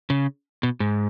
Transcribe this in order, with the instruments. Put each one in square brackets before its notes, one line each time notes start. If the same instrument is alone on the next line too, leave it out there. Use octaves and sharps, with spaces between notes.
[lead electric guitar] C#3
B2
G#2